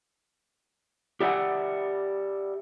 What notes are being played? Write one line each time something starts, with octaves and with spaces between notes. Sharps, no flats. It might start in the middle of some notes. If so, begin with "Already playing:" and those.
G4 D5 E5 F#5 G#5